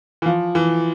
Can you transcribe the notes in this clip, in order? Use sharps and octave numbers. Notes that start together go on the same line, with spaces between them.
E3
F3
E3